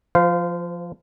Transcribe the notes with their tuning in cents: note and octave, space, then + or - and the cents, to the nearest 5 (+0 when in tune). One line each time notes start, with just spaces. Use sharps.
F3 +0 C5 -30 F5 +0